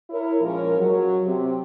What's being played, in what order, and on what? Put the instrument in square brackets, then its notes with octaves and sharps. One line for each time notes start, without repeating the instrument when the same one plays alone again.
[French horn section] E4 A#4 C#5
A#2 F3 G#3 C#4 A#4
F#3
C3